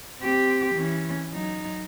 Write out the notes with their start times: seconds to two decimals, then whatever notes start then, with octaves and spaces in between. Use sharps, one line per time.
0.21 C4 G4
0.74 E3 C#4
1.31 F#3 D#4